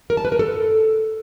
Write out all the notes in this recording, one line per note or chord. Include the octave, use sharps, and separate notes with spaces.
A#4
A5
B4
A#4
A4